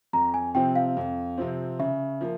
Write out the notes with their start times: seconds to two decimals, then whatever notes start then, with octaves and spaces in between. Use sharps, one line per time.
0.13 F2 A#5
0.34 G#5
0.55 C3 F3 C4 G5
0.76 F5
0.97 F2
1.37 C3 F3 C4
1.79 C#3 E5
2.21 F3 A#3